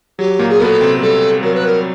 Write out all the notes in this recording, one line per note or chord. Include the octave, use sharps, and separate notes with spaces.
F#3 G4
A#2 A#3
G#4
B2 B3 A4 A#4
C3 C4
G3 A4
F#3 A#4
B4
A#4